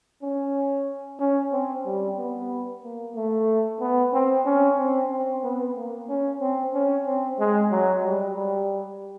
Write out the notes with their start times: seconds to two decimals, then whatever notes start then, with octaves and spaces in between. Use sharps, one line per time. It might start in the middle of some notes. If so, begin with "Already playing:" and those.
0.22 C#4
1.19 C#4
1.52 C4
1.86 G3
2.18 B3
2.83 A#3
3.16 A3
3.80 B3
4.13 C4
4.46 C#4
4.78 C4
5.11 C4
5.43 B3
5.76 A#3
6.09 C#4
6.41 C4
6.74 C#4
7.06 C4
7.39 G#3
7.71 F#3
8.04 G3
8.36 G3